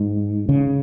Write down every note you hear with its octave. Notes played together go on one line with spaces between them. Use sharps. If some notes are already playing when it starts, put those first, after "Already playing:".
Already playing: G#2
C#3